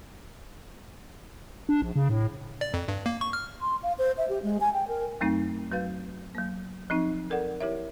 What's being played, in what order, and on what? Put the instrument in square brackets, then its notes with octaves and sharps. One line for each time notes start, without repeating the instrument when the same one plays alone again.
[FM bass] D4
A#1
C#3
A2
[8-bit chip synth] D5
F2
G2
A#3
C#6
F6
[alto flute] C6
F5
C5
E5
G4
G#3
G#5
G5
A#4
[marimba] F#2 F#3 A3 C4 D#4
F#3 F#4 B4 F5 G6
F#3 A#3
F3 C4 D#4
A4 A#4 D5 F#5
E4 G4 A#4 C#5 E5